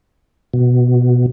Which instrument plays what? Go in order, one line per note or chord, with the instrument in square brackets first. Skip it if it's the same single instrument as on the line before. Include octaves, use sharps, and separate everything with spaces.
[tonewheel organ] B2